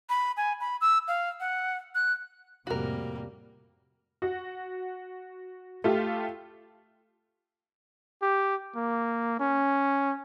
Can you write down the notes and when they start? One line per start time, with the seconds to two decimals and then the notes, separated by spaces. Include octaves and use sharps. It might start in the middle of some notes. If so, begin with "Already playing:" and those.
0.09 B5
0.37 G#5
0.61 B5
0.81 E6
1.08 F5
1.40 F#5
1.95 F#6
2.67 F2 A2 C3 G3 A#3 F#4 A#4
4.22 F#4 F#5
5.84 A3 F4 G4
8.22 G4
8.76 A#3
9.40 C#4